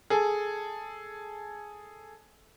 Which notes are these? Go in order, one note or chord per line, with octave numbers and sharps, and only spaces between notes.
G#4 A4